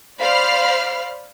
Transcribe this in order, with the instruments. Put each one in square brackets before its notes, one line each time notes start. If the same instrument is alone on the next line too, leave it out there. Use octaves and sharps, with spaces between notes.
[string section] C5 D5 F5 B5 F6 C7